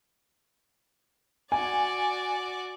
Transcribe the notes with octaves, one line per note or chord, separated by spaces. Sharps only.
F#4 D5 G#5